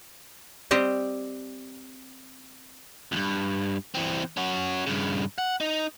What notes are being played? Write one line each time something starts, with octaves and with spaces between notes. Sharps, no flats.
G3 C4 G4 C5 D#5
C#2 G2
E3 C4
C#4 F#4
G2 C#3
F#5
D#4